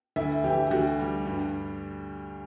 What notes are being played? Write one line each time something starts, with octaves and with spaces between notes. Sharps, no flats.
D2 E4 E5
E3 G4
G4
D2 F#4
G3
G2